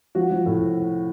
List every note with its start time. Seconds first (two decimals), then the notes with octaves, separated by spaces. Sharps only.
0.15 F3 F#4
0.31 F3
0.46 A2